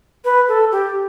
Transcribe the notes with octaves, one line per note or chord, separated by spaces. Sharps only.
B4
A4
G4